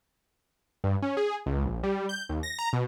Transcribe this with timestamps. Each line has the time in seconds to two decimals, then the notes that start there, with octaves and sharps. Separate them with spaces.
0.84 G2
1.02 C#4
1.17 G#4
1.46 C#2
1.65 A#1
1.83 G3
2.09 G6
2.29 D#2
2.43 A#6
2.59 A#5
2.73 B2